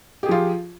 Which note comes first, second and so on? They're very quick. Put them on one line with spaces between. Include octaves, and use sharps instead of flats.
G4 G#4 F3 F4